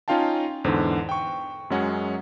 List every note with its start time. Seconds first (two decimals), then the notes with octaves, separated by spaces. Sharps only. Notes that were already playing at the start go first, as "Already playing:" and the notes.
0.08 C#4 D#4 F4 F5 G5 A5
0.64 E2 G#2 D3 C5
1.09 G5 C#6
1.70 F#2 F#3 G#3 C#4 F#5